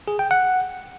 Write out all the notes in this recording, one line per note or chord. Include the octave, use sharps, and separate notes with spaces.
G#4
G5
F#5